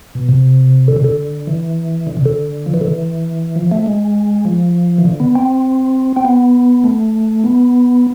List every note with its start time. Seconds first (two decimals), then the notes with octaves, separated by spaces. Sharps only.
0.15 B2
0.28 C3
0.88 D3
0.96 C3
1.04 D3
1.47 E3
2.07 D3
2.17 C3
2.26 D3
2.66 F3
2.74 E3
2.81 D3
2.87 E3
3.56 F3
3.72 A3
3.86 G#3
4.45 F3
4.98 E3
5.05 D3
5.20 B3
5.35 C4
6.16 C4
6.25 B3
6.84 A3
7.44 B3